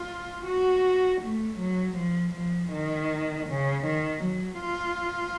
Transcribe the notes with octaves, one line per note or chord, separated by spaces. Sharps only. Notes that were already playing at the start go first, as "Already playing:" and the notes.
Already playing: F4
F#4
A3
F#3
F3
F3
D#3
C#3
D#3
F#3
F4